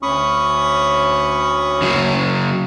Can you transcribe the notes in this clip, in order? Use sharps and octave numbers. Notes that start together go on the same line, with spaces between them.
D2 C#4 B5 C#6 D#6
C#3 F#3